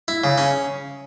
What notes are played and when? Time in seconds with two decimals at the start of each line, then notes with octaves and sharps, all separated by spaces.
0.08 E4
0.24 C#3
0.38 C#4